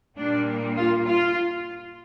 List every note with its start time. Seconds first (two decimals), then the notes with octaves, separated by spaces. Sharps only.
0.17 A#2 G3 A#3 D4
0.77 F4
1.06 F4